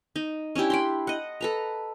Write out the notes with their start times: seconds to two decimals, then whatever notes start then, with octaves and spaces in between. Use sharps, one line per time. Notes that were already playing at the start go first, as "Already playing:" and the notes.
0.16 D#4
0.55 C#4 D4 E4 G4
0.70 G5 B5 C6
1.07 D#5 F#5
1.41 A4 B4 A#5